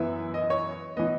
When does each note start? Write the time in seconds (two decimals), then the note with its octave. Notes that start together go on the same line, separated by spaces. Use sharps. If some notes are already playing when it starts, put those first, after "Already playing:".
Already playing: F#2 E3 B3 E4 E5
0.34 D#5
0.50 C#5
0.97 E3 B3 D#5